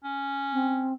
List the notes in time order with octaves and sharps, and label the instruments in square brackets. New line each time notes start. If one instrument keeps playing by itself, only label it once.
[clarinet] C#4
[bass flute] C4